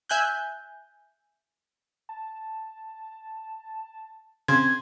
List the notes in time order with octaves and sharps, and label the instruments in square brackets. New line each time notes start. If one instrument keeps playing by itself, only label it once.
[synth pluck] E5 G#5 F#6 G6
[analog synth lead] A5
[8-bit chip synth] C#3 [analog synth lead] C4 [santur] C6 [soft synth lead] G#6